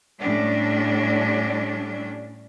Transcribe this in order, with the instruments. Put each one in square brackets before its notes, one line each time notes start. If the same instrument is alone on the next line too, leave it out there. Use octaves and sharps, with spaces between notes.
[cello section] A2 G3 C#4 D4